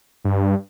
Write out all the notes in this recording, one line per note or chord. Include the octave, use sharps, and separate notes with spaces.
G2